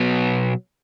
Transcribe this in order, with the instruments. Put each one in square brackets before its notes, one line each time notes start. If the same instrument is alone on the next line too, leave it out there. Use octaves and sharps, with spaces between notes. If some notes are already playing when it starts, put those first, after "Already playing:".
Already playing: [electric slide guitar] B2 F#3 B3